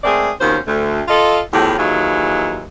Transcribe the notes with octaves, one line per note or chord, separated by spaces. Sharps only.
G#3 A3 C4 G#4 A#4 D5
D#2 B2 D#3 C#4 F4 C5
D2 A3
F4 A4 D#5
E2 A2 F3 F#3 G4
D#2 E3 F#3 D#4 F4 G#4